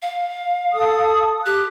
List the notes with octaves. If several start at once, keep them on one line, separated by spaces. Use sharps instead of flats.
F5
A4 D#6
G4 F#6